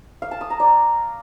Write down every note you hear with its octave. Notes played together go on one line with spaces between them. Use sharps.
F5
A5
D#6
A#5
D5